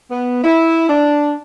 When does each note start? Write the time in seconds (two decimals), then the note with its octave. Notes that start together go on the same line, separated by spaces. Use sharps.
0.11 B3
0.44 E4
0.89 D4